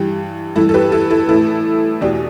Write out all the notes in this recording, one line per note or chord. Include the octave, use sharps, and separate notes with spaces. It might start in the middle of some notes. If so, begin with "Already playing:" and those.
Already playing: G2 E3 G4
G2 E3 E4 A4
A4
G4 B4
E4 A4
E4 A4
A2 E3 E4 A4
E2 B2 D4 G4